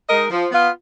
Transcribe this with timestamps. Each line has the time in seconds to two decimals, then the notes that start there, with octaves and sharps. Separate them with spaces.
0.08 G#3 D#4 A#4 D#5
0.30 F3
0.51 B3 F4